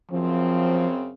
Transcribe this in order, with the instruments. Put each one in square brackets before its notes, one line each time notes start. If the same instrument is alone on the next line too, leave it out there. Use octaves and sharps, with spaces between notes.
[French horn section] F#2 C#3 C4 [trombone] F3